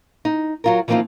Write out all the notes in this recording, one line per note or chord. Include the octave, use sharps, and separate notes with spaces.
D#4
F#3 F4 A#4
E3 F3 A#3 C4 D#4 F4